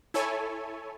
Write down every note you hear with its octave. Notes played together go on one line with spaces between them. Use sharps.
E4 A4 C#5 G#5